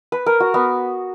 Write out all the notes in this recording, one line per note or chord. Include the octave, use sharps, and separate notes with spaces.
B4
A#4
F#4
B3